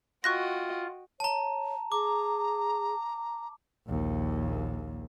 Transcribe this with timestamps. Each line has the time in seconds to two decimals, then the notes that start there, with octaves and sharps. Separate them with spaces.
0.24 F4 F#4 D#5 G5 C#6 F#6 A#6
1.20 C#5 A5 A#5
1.92 G#4 A#5 D6
3.87 A#1 D#2